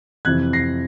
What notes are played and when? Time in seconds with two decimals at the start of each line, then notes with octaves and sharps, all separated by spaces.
0.25 F2 C3 E3 F#6 G#6
0.53 A#6 C7